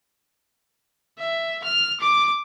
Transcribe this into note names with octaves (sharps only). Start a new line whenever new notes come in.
E5
F6
D6